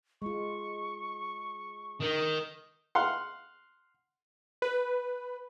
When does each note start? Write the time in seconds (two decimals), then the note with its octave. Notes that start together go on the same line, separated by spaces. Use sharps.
0.22 G#3 F4 C#6
2.00 D#3
2.95 F5 F#5 C6
4.62 B4